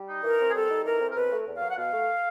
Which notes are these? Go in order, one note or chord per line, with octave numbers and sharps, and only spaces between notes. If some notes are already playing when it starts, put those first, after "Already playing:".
Already playing: G3
D#4
E3 A#4
C4
G#4
G3 A4
D#4
E3 A#4
C4
A#4
B2 B4
A3
E2
F#3 F5
F#5
B2 F5
A3